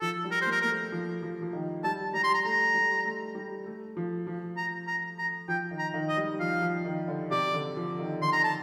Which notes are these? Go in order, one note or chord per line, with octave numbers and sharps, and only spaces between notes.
F3 A4
G3
A#4
C5
A#3
A#4
A#3 A#4
A3
F3
F3
F3
D#3
G3 A5
G3 A#5
C6
A#5
A3 A#5
G3
A3
G3
A3
F3
F3
A#5
A#5
A#5
F3 G5
D#3
A#5
D#3
D#5
G3
F3 F5
F3
D#3
D3
C3 D5
D3
F3
D#3
D3 C6
A#5
A5